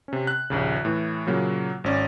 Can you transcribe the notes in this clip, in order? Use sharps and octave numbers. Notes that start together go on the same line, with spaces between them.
C3 C#4
F#6
A#1 D#2 C#3
A2 E3
A#2 C#3 F#3 A#3
G#1 C#4 D5